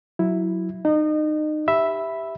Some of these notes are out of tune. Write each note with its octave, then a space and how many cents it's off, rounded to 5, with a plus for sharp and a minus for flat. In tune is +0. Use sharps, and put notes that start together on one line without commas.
F#3 +0 E4 +0
D#4 -25 D#5 -35
G4 +0 E5 +0 B5 +0